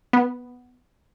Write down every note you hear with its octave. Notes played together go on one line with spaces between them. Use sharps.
B3